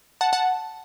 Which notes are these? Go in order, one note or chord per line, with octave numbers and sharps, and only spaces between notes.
F#5 A5
F#5 A5